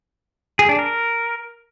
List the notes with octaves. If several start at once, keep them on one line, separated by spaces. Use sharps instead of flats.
G#4
D4
A#4